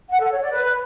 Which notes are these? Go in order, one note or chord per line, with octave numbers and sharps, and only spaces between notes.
F#5
A4
C#5
D5
B4